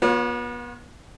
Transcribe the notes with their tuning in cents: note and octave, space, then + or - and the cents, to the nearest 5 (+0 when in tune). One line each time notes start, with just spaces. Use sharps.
B3 -35 F4 +40 C#5 +0